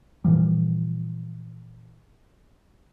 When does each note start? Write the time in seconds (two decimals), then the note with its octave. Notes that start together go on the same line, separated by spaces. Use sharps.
0.24 A#2 E3 F3 G3